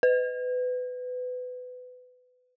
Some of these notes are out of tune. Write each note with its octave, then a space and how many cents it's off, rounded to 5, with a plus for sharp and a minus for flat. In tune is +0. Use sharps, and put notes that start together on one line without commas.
B4 +25